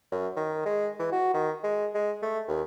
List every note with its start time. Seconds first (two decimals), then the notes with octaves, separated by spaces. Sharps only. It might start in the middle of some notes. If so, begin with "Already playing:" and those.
0.12 F#2
0.36 D#3
0.66 G#3
1.00 E3
1.12 F#4
1.34 D#3
1.64 G#3
1.94 G#3
2.23 A3
2.48 D#2